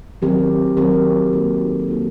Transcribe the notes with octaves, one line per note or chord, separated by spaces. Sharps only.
D#3 F#3 C4 G4 A#4
D#3 F#3 C4 G4 A#4
A#3 D#4 F#4 A4
A#3 D#4 F#4 A4